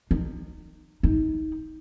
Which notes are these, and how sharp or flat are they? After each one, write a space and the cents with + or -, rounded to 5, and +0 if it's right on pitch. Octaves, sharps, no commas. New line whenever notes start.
D#4 -25
D#4 +20